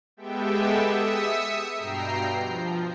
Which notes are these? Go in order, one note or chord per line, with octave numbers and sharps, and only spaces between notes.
G#3 B3 G4 A4 E5 G5
E5 D#6 E6 B6 C#7
G2 B2 G5 A#5 C7
F3